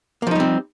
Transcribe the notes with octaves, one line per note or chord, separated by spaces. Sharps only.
F3 G3 A#3 C4 D#4